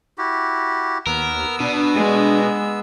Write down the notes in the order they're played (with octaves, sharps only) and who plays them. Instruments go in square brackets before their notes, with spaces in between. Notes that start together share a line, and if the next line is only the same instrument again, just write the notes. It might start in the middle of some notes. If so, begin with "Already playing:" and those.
[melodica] E4 F#4 G4
[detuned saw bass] D#2 [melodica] B3 E6 [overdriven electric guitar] A#4
[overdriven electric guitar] B2 [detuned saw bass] D4
[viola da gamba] G#3